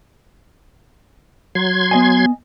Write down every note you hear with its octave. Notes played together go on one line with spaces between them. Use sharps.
F#3 C6 G#6
B3 D#5 G#5